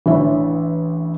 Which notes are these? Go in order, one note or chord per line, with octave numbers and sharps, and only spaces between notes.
A1 E3 D4 C#5 E5